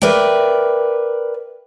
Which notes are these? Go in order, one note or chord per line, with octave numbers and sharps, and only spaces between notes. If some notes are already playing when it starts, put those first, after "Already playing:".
A#4 B4 D5 E5 G5